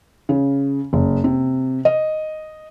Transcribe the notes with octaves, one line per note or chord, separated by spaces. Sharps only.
C#3
F#1
C3
D#5